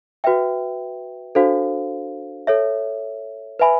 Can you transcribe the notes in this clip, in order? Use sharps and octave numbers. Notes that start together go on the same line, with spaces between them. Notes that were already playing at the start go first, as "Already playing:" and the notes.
F#4 B4 E5 G5
D4 F#4 A4 C5 F5
A4 C#5 E5
B4 E5 G#5 B5